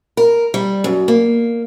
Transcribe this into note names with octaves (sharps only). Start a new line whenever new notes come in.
A#4
G3
F#2
A#3